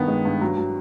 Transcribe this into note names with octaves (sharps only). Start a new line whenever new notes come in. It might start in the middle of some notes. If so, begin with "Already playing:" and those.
Already playing: G2 D#3 G3 B3
G#3
G2
F#3
F#3